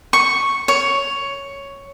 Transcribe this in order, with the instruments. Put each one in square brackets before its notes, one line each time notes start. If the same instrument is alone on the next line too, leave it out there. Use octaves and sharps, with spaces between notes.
[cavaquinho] C#6
C#5